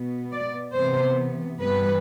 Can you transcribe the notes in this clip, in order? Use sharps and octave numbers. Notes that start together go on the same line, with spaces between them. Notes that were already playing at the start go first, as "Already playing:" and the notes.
Already playing: B2 B3
D5
C3 E3 B3 C5
G2 E3 G3 B3 B4